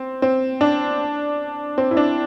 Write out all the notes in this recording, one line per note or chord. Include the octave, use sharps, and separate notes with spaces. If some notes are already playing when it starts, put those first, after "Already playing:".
Already playing: C4
C4
D4
C4
E4
D4